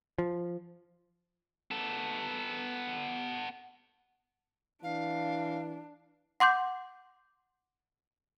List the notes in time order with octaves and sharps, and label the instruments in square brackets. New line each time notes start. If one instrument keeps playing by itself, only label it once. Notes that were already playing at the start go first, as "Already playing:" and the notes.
[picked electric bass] F3
[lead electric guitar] B3 A4
[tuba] E3 [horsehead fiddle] D4 [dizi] F5
[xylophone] F#5 C6 D6 G6